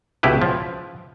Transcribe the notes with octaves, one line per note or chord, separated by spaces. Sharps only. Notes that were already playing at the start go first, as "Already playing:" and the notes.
C#2 B2 E4 G4 B4
F3